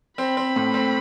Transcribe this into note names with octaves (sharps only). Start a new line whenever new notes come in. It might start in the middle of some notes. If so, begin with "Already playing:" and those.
C4 B5
C4
A2
C4